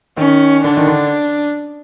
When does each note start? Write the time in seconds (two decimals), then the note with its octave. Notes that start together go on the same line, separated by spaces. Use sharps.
0.17 D#3 C#4
0.64 D3 D4
0.77 D#3
0.87 D3